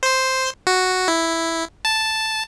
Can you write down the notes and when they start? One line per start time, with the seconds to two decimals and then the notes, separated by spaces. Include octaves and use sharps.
0.03 C5 C6
0.67 F#4
1.08 E4
1.85 A5